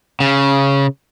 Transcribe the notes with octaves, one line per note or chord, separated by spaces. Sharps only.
C#3